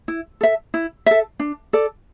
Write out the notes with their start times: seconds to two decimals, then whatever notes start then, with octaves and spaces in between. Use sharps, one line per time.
0.08 E4
0.41 A4 E5
0.74 E4
1.06 A4 E5
1.40 D4
1.73 A4 D5